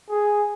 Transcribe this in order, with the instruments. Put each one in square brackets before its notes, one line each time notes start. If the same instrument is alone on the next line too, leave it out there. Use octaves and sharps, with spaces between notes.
[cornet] G#4